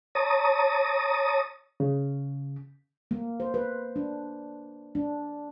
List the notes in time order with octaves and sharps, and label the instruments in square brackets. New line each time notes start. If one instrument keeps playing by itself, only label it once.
[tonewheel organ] C#5 A5 A#5 D#6
[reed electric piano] C#3
[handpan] A#3
C5
B4
D4
D4